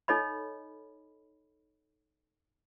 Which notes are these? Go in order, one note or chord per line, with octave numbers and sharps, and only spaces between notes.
D#4 A4 C#5 D#5 B5